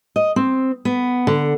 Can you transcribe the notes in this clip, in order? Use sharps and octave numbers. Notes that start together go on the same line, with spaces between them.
D#5
C4
B3
D3